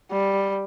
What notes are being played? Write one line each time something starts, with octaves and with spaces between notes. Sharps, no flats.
G3